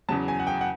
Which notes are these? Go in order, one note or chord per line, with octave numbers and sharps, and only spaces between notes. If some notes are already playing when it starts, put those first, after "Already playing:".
E2 C#3 F#3 A5
G#5
F#5
G5
F#5